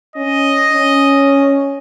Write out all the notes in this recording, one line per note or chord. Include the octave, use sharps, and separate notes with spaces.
C#4 D#5
C#4